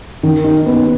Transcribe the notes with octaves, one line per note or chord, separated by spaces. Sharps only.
D#3
D#4
B3